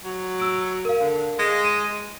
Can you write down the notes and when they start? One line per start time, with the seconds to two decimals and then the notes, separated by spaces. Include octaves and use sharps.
0.04 F#3
0.40 E6 D7
0.85 A#4 F5
1.00 D3
1.39 G#3
1.64 D#7